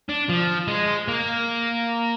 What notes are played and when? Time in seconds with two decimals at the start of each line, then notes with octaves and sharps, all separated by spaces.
0.09 D4
0.29 F3
0.68 G#3
1.08 A#3